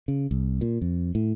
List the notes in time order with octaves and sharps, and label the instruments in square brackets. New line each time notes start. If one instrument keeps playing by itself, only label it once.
[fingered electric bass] C#3
C2
A#2
F2
A2